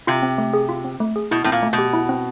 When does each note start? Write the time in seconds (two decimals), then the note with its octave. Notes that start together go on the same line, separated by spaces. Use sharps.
0.07 C3 F4
0.23 C4
0.38 A3
0.54 G#4
0.69 F4
0.84 C4
1.00 A3
1.16 G#4
1.31 B2 E4
1.44 A2 C4
1.52 A#2
1.63 A3
1.73 B2
1.78 G4
1.93 E4
2.09 C4